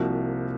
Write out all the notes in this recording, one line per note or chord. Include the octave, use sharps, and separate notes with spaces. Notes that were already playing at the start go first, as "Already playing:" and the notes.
Already playing: C2 C3 F3 A#3 F#4